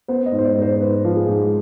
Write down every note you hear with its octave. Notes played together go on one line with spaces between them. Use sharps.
B3 C5
D#5
G#2
C5
D5
G#2 C5
G#2 B4
F3
G#4
G#2